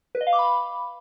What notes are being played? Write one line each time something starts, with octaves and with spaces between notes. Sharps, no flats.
B4
D#5
F5
D6
B5